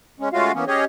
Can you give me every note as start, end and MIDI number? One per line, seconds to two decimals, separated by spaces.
0.20 0.29 56
0.20 0.29 61
0.33 0.52 56
0.33 0.52 57
0.33 0.52 61
0.33 0.52 65
0.33 0.52 66
0.33 0.52 77
0.54 0.65 52
0.54 0.65 58
0.54 0.65 59
0.54 0.65 61
0.68 0.85 61
0.68 0.85 67
0.68 0.85 68
0.68 0.85 73
0.68 0.85 75